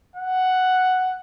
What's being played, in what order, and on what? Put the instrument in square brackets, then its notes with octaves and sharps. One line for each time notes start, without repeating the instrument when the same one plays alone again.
[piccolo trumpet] F#5